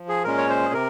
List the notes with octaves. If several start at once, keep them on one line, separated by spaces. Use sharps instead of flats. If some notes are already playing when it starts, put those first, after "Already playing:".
Already playing: F3
G#4
A#2 G#3 C#4 A#4
C#5
C5
G#4
C3 A#4